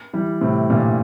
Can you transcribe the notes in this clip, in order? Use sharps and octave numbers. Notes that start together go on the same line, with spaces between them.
E3 G3
A2 C3
G2 A#2